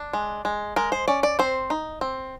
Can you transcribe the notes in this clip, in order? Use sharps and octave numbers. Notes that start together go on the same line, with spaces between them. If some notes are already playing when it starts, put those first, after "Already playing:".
Already playing: D4
G#3
G#3
G#3 A#4
C5
C#4 D5
D5
C4 C5
D#4
C4